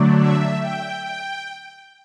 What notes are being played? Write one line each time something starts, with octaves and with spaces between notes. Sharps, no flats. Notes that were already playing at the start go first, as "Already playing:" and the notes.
Already playing: D3 F#3 A3 D4
E5
G5
G5